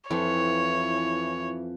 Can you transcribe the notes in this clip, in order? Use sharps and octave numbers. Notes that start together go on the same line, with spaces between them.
F2 E3 E4 C#5